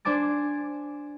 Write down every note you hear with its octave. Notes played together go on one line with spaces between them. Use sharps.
D4 C5 G#5 D6 A6